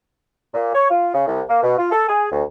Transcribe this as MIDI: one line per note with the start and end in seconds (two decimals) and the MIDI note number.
0.54 0.74 46
0.74 0.89 73
0.90 1.09 65
1.14 1.26 49
1.27 1.42 36
1.49 1.61 58
1.63 1.75 47
1.78 1.91 65
1.92 2.06 69
2.09 2.29 68
2.32 2.43 38